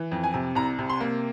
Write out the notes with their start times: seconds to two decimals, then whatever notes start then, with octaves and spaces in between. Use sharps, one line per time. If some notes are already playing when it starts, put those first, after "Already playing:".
Already playing: E3
0.12 F2
0.24 G#5
0.34 C3
0.55 C2 A#5
0.79 C3
0.89 C6
1.00 A#3